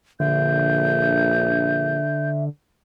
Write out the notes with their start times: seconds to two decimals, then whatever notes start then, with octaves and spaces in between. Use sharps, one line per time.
0.20 A#1 D3 E5 G6